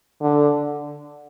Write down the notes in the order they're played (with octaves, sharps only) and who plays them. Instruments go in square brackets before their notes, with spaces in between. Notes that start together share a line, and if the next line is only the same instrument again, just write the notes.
[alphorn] D3